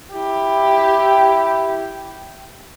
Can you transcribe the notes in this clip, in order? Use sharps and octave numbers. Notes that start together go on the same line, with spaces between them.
E4 G4